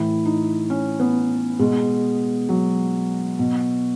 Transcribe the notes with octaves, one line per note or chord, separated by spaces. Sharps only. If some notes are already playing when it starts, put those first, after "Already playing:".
Already playing: A2 E3 E4
D#4
C#4
B3
B2 G#3
F#3
B2